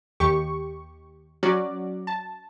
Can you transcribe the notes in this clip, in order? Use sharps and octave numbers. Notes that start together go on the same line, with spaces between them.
D#2 G4 C#6
F#3 C#4 F#4 D5
A5